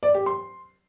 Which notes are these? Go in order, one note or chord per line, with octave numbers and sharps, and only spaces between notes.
D5
G4
C6